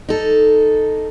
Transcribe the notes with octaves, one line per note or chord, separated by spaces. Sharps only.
D#4 A4